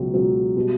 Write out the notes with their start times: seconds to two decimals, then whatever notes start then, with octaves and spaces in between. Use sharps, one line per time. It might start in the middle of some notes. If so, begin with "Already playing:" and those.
Already playing: C#2 B2 F#3
0.14 C#2 B2 F#3
0.56 B2 G3